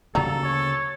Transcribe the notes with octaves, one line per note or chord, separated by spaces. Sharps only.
D2 C#3 F#3 G3 A#3 A4 A#5
C#5